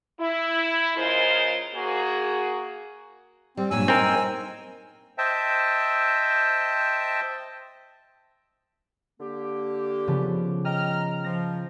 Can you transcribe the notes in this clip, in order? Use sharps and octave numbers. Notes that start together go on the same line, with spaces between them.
E4
C#3 G#3 F4 A#4 C5 D#5
A#3 F#4 G#4
G3 C4
G2 A#2 F#3 G#5 E6
C4 D#4 A#4
C5 D#5 E5 G5 A5
D3 A#3 G4
C#3 F3 B3
D#5 G5 A#5 F6
F3 A#6